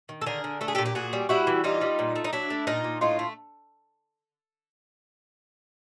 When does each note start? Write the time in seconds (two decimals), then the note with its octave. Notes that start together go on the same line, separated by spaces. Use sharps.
0.09 D#3
0.21 A4
0.26 D3 G#4 A#4
0.44 D3
0.61 A3 A4
0.68 G#4
0.75 A#2 G4 A4
0.86 G4
0.95 A#2 F#4 G#4
1.13 G3
1.29 G3 E4 F#4
1.47 E3
1.64 G3 D#4 F4
1.81 G3
1.99 A#2
2.16 A3
2.24 D#4
2.33 F#3 D4 E4
2.50 A3
2.67 A#2 D#4 F4
2.84 A#2
3.01 A2 D#4 F4
3.19 A3